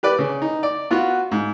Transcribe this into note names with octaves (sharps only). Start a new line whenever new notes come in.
G4 B4 D5
C#3
D#4
D5
B3 F4 F#4
G#2